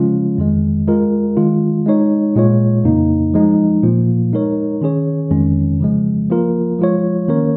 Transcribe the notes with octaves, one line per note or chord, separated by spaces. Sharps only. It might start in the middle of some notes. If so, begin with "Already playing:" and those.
Already playing: C#3 F3 G#3 C#4 F4
F2 D#3 G#3
G#3 F4 A#4
D#3 G#3 F4
G#3 D#4 C#5
A#2 G#3 F4 C#5
F2 C#3 A#3 D#4
F3 G#3 D#4
A#2 F3 A#3 F4
G#3 D#4 A#4 C#5
D#3 C#4 G#4 C#5
F2 D#3 G#3 C#4
C#3 F3 G#3
F3 A#3 F4 A#4
F3 G#3 F4 C#5
D#3 A#3 C#4 A#4 C#5